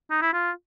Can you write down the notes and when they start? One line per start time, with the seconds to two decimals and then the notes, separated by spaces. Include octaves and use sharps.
0.10 D#4
0.22 E4
0.33 F4